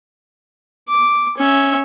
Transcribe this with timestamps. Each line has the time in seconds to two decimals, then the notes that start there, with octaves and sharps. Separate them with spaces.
0.88 D6
1.37 C#4 E5